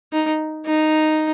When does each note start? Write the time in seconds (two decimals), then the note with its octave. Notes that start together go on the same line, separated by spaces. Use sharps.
0.13 D#4
0.66 D#4